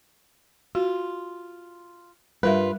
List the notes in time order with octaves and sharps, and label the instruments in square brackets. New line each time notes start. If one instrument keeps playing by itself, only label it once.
[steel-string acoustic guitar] F4 [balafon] F#4
[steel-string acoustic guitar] G2 F4 B4 [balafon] G3 A#4 E5